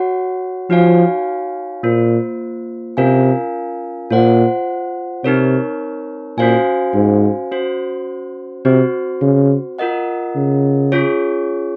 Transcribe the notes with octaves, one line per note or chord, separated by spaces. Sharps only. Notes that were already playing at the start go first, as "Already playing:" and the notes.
Already playing: F#4 C#5 F#5
F3 D#4 F#4 C#5 F5 G#5
A#2 A#3 F4 C5
C3 C#4 F4 A#4 F5 G#5
A#2 F4 C5 F#5
C3 C4 D#4 A#4 C#5
A#2 C#4 F#4 C5 F5 G#5
G#2
C#4 F#4 C5
C3 C4 F#4 C5
C#3
F4 A#4 D#5 F#5
C#3
C#4 F4 G#4 C#5